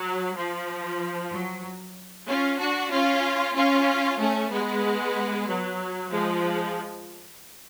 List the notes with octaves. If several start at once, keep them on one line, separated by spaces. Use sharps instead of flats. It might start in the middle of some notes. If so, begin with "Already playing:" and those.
Already playing: F#3
F3
F#3
C#4 F4
D4 F#4
C#4 F4
C#4 F4
A3 C#4
G#3 B3
F#3
F3 G#3